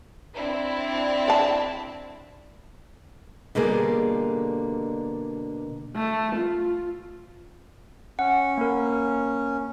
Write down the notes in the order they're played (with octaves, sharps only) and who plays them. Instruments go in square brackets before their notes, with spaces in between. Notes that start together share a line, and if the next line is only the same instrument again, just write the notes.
[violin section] C4 D4 E4
[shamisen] D5 A5
[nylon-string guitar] B2 D3 G3 A#3 G#4
[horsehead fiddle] A3
F4
[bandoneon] C#4 [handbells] F#5
[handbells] A#3 A#4